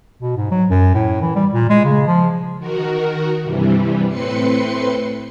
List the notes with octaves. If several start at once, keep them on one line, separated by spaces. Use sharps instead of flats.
B2
G#2
F#3
F#2
A2
E3
G3
A#2
G#3
C#3
F3
D#3 F#4 A#4
G2 C3 E3 G3
A2 C4 B4 C6 C#7